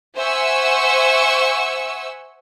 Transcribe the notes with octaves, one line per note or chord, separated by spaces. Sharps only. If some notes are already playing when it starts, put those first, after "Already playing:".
C5 E5 F#5 G#5 C#6 E6